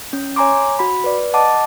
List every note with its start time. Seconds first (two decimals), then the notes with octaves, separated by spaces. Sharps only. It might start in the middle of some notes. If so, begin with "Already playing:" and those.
0.13 C#4
0.36 C#5 G#5 A#5 C6 D6
0.79 F#4 B5
1.04 B4 D5
1.34 D#5 F#5 A5 D6